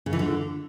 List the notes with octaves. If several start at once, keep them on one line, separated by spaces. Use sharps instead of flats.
C#3
E3
D3